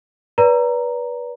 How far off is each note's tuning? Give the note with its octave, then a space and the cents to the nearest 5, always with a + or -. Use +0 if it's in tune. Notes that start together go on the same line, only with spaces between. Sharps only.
B4 -25 D5 -35 A#5 +0